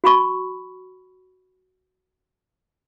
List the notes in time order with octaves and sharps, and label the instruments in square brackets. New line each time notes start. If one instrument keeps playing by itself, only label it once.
[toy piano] F#4 B5 C#6